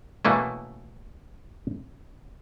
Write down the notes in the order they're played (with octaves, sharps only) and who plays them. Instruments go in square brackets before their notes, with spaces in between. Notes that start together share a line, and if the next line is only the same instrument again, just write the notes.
[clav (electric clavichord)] B2 E3 A3 A#3 C#4